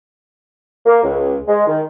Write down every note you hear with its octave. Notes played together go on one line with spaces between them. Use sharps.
A#3
C#2
G#3
D#3